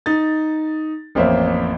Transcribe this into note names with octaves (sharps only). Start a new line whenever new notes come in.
D#4 A6
A1 F2 A#3 C5 C#5 E5